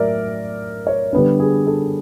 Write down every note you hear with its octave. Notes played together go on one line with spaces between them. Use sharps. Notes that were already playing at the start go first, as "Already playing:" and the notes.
Already playing: A2 F#3 A#4 D5 E5
C#5
D3 G3 B3 D4 B4
G#4
A4